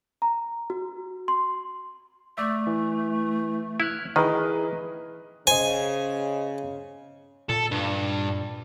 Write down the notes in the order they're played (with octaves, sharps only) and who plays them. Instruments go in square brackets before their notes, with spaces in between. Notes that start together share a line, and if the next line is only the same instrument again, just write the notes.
[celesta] A#5
F#4
C6
[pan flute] A3 [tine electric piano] D5 E5
[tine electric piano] E3
[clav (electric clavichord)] E4 [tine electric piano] F6 F#6 G#6
[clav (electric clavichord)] D#3 [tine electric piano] E3 [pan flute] G#4 [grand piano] B4 D#5 A#5
[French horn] C#3 [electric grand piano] C5 D#5 [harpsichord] G#5
[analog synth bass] A#2 [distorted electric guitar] A4
[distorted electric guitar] G2